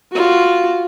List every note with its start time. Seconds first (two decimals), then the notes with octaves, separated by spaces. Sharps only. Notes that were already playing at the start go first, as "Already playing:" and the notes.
0.13 F4 F#4